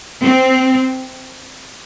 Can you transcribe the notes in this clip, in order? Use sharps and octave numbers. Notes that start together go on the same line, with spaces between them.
C4